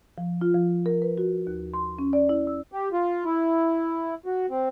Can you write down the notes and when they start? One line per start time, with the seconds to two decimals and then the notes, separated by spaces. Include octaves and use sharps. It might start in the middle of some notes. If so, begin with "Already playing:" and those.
0.18 F3
0.41 F4
0.54 F3
0.86 A#4
1.02 B4
1.18 F#4
1.47 D#2
1.74 C6
1.99 C#4
2.13 D5
2.29 E4
2.47 E6
2.72 G4
2.93 F4
3.25 E4
4.26 F#4
4.50 C4